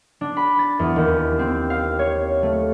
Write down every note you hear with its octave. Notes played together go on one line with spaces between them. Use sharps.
D4
B5
A6
E2
D#2
C4
F5
C#5
A3